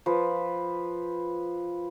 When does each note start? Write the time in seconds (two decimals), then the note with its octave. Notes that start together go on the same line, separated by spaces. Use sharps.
0.06 F3 B4